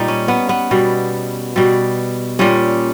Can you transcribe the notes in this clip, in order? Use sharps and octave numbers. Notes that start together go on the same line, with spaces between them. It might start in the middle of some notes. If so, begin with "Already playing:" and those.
Already playing: A#2 G3 D#4
C#4
B3
B3
B2 G3
B2 G3
A#2 G3 C#4